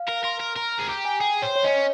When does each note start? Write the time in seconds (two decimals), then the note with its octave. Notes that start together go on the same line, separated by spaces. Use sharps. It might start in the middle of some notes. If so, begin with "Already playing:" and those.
Already playing: F5
0.09 A#4
0.24 A#4 C6
0.40 A#4
0.56 A#4 A#5
0.72 A#5
0.79 G#4
0.89 G4 A#5
1.05 G#5
1.21 G#4 G5
1.42 C5 C#5
1.56 C#5
1.64 C#4 D#5